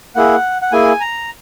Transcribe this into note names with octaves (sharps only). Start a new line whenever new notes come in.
A#3 E4 G#4 F#5
F#5
A#3 E4 G#4 G#5
A#5